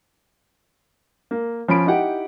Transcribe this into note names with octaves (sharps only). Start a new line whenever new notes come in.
A#3
F3 C#4 B5 D7
D#4 E4 G4 F#5 G5